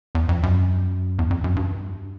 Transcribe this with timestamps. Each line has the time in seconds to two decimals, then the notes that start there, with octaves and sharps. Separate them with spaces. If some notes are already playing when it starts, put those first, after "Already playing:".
0.15 E2
0.29 F2
0.43 F#2
1.19 E2
1.30 F2
1.44 F#2
1.56 G2